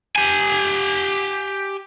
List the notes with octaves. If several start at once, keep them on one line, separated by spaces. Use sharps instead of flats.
G4 G#5